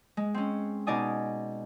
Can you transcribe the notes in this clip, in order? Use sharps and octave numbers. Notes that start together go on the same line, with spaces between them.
G#3
C4 C#4
B2 D#4 D5 G#5 D#6